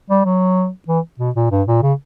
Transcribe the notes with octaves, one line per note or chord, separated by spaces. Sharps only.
G3
F#3
E3
B2
A#2
G2
A#2
C#3